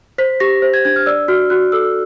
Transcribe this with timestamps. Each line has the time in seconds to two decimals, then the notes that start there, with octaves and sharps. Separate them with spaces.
0.18 C5 B6
0.40 G4 A#6
0.62 C5
0.74 G#6
0.85 D4 G#6
0.96 F6
1.06 D5 E6
1.28 F#4 F6
1.50 F#4 F#6
1.72 A4 E6